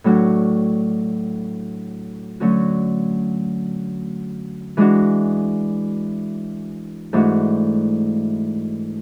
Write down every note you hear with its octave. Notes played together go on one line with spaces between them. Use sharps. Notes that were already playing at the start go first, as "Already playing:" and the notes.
A2 F#3 A3 D4 F#4
D3 F#3 A3 C#4 F#4
E3 G#3 D4 F#4
G#2 E3 A3 D4 F#4